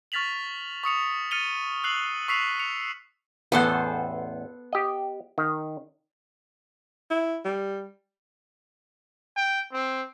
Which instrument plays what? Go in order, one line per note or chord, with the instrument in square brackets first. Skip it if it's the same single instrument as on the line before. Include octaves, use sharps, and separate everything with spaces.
[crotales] C#6 F6 A6 B6 F7 F#7
C#6 D#6 C#7 F7
F6 A6 C#7 D#7 F7 G7
E6 F#6 C7 F7 F#7
C#6 E6 B6 C7 D#7 F7
C#7 F7
[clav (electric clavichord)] A1 E2 F#5 [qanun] B3 A4 C5
[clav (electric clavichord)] G4 D#5
D#3
[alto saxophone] E4
G3
[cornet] G5
C4